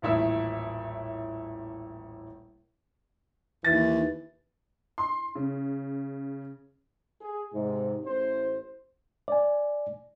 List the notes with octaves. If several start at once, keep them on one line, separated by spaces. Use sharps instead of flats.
D#1 A1 E4 E6
D#2 E3 A6
C6
C#3
G#4
G#2 C3
A1 C5
D5 G#5